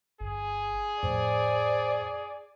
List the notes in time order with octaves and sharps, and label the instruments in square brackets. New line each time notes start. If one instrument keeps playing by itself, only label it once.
[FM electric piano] G1 [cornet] G#4
[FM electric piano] F2 A2 [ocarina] C5 [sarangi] D5